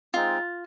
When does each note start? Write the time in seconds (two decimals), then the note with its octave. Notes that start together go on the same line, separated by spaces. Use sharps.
0.14 G#3 C4 D#4 F4